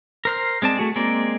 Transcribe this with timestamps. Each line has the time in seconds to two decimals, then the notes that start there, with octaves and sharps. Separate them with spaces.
0.25 A#4 C5 F6
0.62 G#3 C4 D5 A5
0.77 A3 F#4 G#4
0.96 G#3 A#3 C4 D5